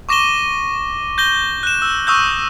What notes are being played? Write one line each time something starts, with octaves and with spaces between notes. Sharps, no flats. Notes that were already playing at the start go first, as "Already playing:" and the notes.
C#6 D6 A#6 D#7 E7 G7
G6 A#6 G7
F#6 E7
E6
C#6 D#6 E6 F#6 G6